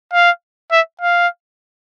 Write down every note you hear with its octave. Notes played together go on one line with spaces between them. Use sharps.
F5
E5
F5